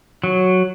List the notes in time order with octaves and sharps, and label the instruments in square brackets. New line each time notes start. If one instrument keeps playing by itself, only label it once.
[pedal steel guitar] F#3